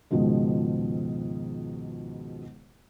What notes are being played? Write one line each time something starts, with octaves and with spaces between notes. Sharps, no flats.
C#2 G#2 B2 D#3 F3 G#3